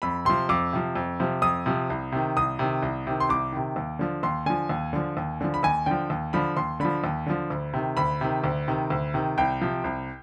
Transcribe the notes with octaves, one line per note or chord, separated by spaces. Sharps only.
F2 B5
C3 F3 C6
F2 D6
C3 F3
F2
C3 F3
F2 D#6
C3 F3
C2
C3 D#3
C2 D#6
C3 D#3
C2
C3 D#3
C6
C2 D6
C3 D#3
D#2
D3 F3
D#2 C6
D3 F3 G#5
D#2
D3 F3
D#2
D3 F3
B5
D#2 G#5
D3 F3 G5
D#2
D3 F3 B5
D#2 C6
D3 F3 B5
D#2
D3 F3
D2
C3 D#3
D2 B5
C3 D#3
D2
C3 D#3
D2
C3 D#3
C2 G5
C3 F3
C2